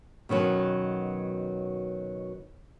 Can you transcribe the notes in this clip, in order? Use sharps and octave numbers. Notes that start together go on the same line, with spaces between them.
B2 D#3 F#3 B3 C#4